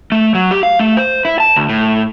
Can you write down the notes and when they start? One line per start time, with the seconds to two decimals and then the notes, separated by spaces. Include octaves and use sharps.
0.12 A3
0.35 F#3
0.51 G4
0.63 F5
0.79 A3
0.97 C5
1.25 E4
1.40 A5
1.56 D2
1.69 A2